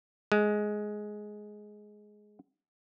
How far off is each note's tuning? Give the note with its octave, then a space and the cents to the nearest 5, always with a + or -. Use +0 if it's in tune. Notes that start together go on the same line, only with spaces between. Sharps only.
G#3 +10